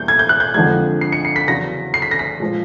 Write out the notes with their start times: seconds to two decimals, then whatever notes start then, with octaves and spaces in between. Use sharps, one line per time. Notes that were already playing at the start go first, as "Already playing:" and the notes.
Already playing: E2 B2 G3 A#3 G6
0.08 G#6
0.19 G6
0.29 F#6
0.40 G6
0.54 F2 D3 F3 G#3 G#6
1.01 C7
1.12 C#7
1.25 C7
1.36 B6
1.47 E2 C#3 F#3 A#6
1.94 C7
2.02 B6
2.11 A#6
2.19 B6
2.40 A#2 F3 G#3